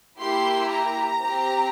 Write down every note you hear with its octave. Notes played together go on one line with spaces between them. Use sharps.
A#3 E4 G4 C6
A#5
C4 G4